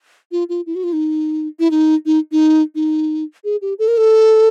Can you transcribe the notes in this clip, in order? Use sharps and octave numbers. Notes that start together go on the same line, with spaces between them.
F4
F4
E4
F#4
F4
D#4
E4
D#4
D#4
D#4
D#4
G#4
G4
A4
A#4
A4